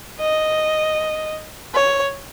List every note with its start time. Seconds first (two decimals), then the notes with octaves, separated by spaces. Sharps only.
0.20 D#5
1.75 C#5